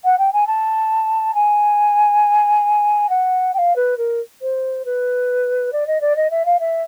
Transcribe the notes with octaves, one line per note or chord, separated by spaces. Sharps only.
F#5
G5
G#5
A5
G#5
F#5
G5
F5
B4
A#4
C5
B4
D5
D#5
D5
D#5
E5
F5
E5